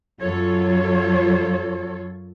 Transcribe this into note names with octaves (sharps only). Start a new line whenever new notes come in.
F#2 F#3 F4 A4 C#5